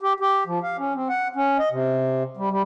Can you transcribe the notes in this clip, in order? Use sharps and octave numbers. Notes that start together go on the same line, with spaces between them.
G4
G4
F3
F5
C#4
C4
F#5
C#4
D#5
C3
G3
G3